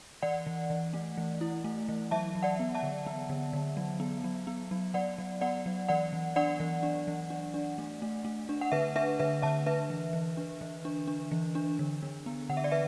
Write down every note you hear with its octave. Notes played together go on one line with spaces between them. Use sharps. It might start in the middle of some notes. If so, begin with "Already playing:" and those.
E3 D5 F#5
E3
E3
A3
E3
E4
A3
E3
F#3 E5 A5
F#3
D5 F#5
B3
E5 A5
D3
B3
D3
D3
F#3
B3
F#3
B3
F#3
F#3 D5 F#5
F#3
B3 D5 F#5
F#3
E3 D5 F#5
E3
D4 D5 F#5
E3
D4
E3
D4
D4
A3
A3
A3
D4
F#5
D3 B4 E5
D4 B4 E5
D3 B4 E5
D3 E5 A5
D4 B4 E5
E3
E3
D4
E3
D4
D4
E3
D4
D3
D3
B3
D3 F#5
E5
D5
B4 E5